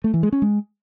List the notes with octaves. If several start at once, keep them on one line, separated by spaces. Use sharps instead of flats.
A3
E3
G#3
C#4
G#3